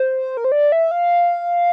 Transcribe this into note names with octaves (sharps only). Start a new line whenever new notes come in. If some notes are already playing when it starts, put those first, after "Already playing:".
Already playing: C5
A#4
C5
D5
E5
F5